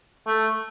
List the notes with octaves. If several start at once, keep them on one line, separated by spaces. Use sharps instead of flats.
A3